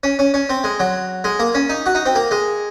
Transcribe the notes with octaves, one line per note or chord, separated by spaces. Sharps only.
C#4
C#4
C#4
C4
G#3
F#3
G#3
A#3
C#4
D#4
F#4
D#4
C4
A#3
G#3